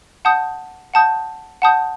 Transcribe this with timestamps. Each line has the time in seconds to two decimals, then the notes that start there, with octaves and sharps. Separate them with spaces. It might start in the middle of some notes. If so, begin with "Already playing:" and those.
0.25 F#5 A5 D#6 G6
0.94 F#5 A5 D#6 G6
1.62 F#5 A5 D#6 G6